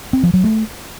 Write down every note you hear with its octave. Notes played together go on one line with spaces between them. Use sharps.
C4
F3
F#3
A3